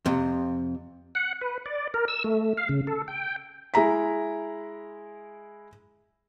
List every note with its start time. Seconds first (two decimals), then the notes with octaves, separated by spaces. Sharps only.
0.06 F2 C3
1.15 F#5
1.41 B4
1.66 D5
1.94 A#4
2.08 E6
2.24 A3
2.57 F5
2.69 C#3
2.87 A4
3.08 G5
3.74 G#3 E4 A#5 B6